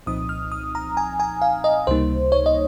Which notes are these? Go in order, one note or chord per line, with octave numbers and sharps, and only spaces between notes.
C2 A#2 F3 C4 D#4 D#6
F6
D#6
A#5
G#5
G#5
F5
D#5
C#2 C3 G3 A#3 D#4 C5
C#5
D#5